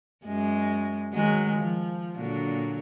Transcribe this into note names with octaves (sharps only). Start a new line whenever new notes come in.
F#2 G#3
D#3 F#3 G#3
F3
A#2 D3 F#3